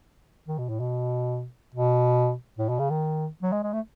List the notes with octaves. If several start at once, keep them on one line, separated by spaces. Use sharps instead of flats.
D#3
B2
A2
B2
B2
A2
B2
C#3
D#3
F#3
G#3
G#3
A3